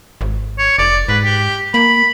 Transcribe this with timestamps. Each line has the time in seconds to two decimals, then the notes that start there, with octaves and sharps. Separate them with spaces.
0.21 G#1
0.58 C#5
0.79 F1 D5
1.09 G#2 B4
1.24 G4
1.74 A#3 B5